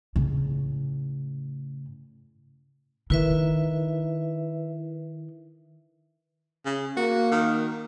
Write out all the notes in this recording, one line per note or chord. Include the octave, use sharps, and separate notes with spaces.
A2 C#3
D#3 E4 B4 E5
C#3
A#3 F#4
D#3